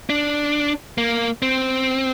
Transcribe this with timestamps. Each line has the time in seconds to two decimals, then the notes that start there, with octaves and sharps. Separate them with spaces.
0.10 D4
0.98 A#3
1.42 C4